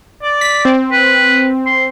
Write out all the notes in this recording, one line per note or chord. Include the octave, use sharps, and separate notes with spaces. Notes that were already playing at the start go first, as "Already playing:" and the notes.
D5
B6
C4
B4
C6